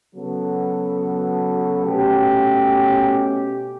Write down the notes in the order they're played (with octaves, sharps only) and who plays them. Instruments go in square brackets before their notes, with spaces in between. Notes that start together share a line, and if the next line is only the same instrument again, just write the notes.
[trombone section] C#3 F#3 B3 F#4 A4
B2 A3 C#4 G4